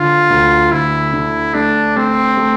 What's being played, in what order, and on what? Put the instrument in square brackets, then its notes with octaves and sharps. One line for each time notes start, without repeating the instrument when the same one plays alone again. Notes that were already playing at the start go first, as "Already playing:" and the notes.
Already playing: [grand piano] D3 [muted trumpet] F4
[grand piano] D2
[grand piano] D2 [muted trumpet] E4
[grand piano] D3
[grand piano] A3 [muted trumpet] D4
[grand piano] A3 [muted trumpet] C4
[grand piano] A3